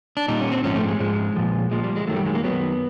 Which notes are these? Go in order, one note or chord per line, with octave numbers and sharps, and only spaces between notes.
D4
A#2 G3 D#4
C#4
C4
G#2 F3 C#4
A3
G#3
G#2 F3 G#3
A#2 F3
A#2 F3 G#3
G3
G#3
F#2 D#3 F#3 A3
G3
G#3
A#3
F#2 D#3 F#3 B3